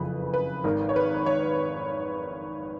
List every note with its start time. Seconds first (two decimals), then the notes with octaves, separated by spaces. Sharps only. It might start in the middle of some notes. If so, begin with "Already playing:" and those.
Already playing: F#1 F2 C#3 F3 B4
0.34 B4
0.64 G#1 G#2 D#3 A#4
0.89 C#5
0.96 B4
1.26 C#5